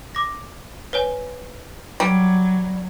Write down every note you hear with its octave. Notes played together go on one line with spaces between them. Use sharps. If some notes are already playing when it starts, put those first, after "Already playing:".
D6 A#6
B4 C#5 G#5
F#3 G3